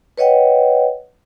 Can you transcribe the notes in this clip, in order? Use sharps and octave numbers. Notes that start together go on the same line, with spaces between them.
B4 C#5 D#5 F#5 G5